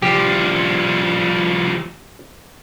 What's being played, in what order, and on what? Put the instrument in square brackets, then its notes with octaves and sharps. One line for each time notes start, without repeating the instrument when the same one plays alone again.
[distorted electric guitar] F3 G3 [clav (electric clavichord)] G4